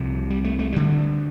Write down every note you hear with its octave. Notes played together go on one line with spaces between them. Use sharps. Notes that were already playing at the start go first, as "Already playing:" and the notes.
Already playing: C2 C3 F3
G3
A3
A3
D2 D3 G3